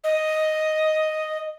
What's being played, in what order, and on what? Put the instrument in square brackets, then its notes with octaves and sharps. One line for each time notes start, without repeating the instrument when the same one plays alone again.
[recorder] D#5